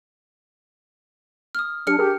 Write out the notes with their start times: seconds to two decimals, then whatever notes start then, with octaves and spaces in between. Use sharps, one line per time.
1.55 D#6 F6
1.87 F#3 D4 G4 F6 C#7
1.99 G4 G#4 A#4 A5